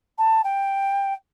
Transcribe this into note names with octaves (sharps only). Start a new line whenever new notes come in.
A5
G5